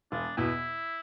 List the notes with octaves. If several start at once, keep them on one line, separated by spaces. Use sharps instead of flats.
E1 D4
E2 B2 E4